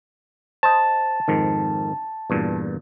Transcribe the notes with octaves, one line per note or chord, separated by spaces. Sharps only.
C5 D#5 A5
F2 G#2 D#3
E2 G2 A#2